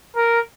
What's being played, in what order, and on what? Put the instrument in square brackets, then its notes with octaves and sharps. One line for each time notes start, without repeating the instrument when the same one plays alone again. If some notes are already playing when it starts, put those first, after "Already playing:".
[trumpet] A#4